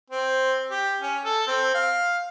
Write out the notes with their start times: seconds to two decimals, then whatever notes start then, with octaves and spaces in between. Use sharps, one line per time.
0.10 C4
0.70 G4
1.01 C#4
1.25 A4
1.47 C4
1.74 F5